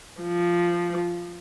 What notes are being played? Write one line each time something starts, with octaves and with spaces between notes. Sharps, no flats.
F3